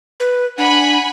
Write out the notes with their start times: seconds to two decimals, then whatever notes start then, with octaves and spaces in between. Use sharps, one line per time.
0.20 B4
0.58 D4 F#5 G#5 B5